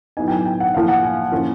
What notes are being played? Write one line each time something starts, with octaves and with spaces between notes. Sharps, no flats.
A2 F#3 B3 D#4 G#5
G5
G#5
G5
F#5
A2 F3 A#3 F5
F#5
G#5
A2 F3 A#3 C#4 F4